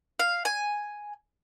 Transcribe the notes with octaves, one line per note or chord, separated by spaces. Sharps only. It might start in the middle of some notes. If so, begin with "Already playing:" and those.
F5
G#5